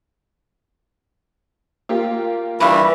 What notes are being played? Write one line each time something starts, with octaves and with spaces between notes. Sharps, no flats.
A#3 F4 G4
G2 E3 G3 B4